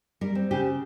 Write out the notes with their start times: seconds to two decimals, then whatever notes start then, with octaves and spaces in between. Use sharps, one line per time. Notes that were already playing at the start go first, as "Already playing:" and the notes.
0.21 G3 A#4
0.35 C4
0.51 C#3 G4